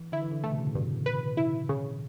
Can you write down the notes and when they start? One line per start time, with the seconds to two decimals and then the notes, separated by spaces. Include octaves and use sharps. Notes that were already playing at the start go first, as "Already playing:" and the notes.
Already playing: E3
0.12 D3 E4
0.22 E3
0.31 D3
0.44 C#3 A3
0.51 B2
0.58 C#3
0.67 A2
0.75 G2 B2
1.06 B4
1.37 E4
1.69 C#3